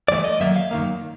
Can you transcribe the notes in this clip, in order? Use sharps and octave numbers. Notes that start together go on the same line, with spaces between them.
G2 E3 A3 D5
D#5
F#2 D#3 F#3 A#3 E5
F5
F#2 D#3 F#3 A#3